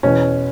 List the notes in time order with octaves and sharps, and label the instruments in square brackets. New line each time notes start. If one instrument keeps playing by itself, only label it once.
[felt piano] E2 B2 C#4